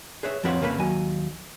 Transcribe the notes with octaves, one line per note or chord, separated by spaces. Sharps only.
G#4 B4 C#5 E5
F2 F3 C4 B4 C#5 F#5
F2 C#3 A#3 G#4 B4 B5
D#2 F#3 G#5